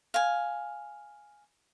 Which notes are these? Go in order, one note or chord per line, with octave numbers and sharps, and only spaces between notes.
F5 G#5